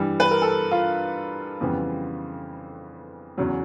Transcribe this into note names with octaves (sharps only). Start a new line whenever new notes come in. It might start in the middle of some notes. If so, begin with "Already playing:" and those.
Already playing: G2 E3 G3
B4
A#4
A4
F4
F2 C#3 E3 G3 B3
E2 C#3 F#3